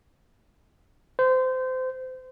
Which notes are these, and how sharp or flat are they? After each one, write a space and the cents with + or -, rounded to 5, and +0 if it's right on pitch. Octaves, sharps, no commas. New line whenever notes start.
C5 -25